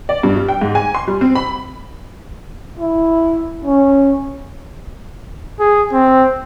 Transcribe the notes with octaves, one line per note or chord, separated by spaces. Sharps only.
D5
G2
G3
G5
G#2
G#5
C6
G3
C4
B5
E4
C#4
G#4
C4